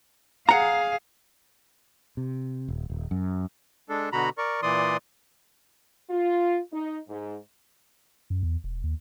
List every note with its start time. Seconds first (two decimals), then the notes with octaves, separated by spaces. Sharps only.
0.49 G#4 F5 F#5 A#5
2.17 C3
2.68 D#1
2.90 D#1
3.11 F#2
3.89 G#3 D4 A4
4.12 B2 D3 F#4 A#5 B5
4.38 A#4 D5 C#6
4.63 A#2 E3 D5 C6 D#6
6.10 F4
6.72 D#4
7.08 G#2
8.30 F#2
8.43 E2
8.64 E1
8.84 D#2